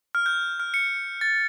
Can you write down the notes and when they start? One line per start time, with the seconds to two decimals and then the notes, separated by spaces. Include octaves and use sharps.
0.15 F6
0.26 G6
0.60 F6
0.74 C#7
1.21 A6